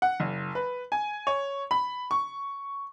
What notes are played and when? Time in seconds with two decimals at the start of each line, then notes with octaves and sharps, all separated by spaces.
0.02 F#5
0.20 F#1
0.55 B4
0.92 G#5
1.27 C#5
1.71 B5
2.11 C#6